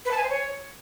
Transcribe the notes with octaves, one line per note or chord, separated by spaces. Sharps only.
B4
A5
G#5
C5
C#5